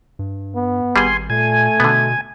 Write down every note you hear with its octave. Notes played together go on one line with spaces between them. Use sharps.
G2
B3
G#1 G3 G#4 G#5 C6
A#2 A3 G#5
B2 D3 B3